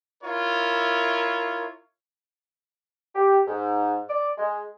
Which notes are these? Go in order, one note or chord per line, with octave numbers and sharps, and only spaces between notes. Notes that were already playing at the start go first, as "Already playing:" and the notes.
E4 F4 A#4 C#5
G4
G#2
D5
G#3